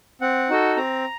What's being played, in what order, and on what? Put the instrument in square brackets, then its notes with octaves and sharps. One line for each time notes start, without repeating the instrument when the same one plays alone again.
[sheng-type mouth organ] C4 F#5
D#4 F#4 A4
C4 A#5